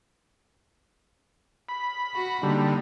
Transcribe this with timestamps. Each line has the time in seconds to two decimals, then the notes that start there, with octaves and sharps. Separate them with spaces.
1.69 B5
2.14 F#4
2.43 D3 G3 A#3 D#4